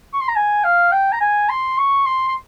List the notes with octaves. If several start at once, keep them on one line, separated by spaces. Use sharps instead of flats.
C#6
C6
A#5
G#5
F5
G5
A#5
G#5
C6
C#6
C6
C6